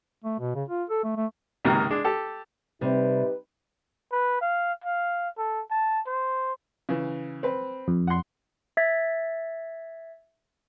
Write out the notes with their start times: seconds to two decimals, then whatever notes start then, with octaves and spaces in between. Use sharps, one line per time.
0.24 A3
0.39 B2
0.55 C#3
0.69 F4
0.90 A4
1.04 A3
1.16 A3
1.65 C#2 G#2 C3 D#3 A#3 A#4
1.90 G#3 D4
2.04 G4 A4
2.81 C3 G3 D#4 G4 B4
4.12 B4
4.41 F5
4.84 F5
5.38 A4
5.71 A5
6.07 C5
6.89 C#3 E3
7.43 C4 B4
7.88 F2
8.07 F#5 C6
8.77 E5 G#6 A6 B6